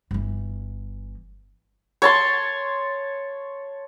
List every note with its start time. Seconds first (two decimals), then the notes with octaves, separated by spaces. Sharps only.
0.11 G1 E3
2.02 C#5 A5 C6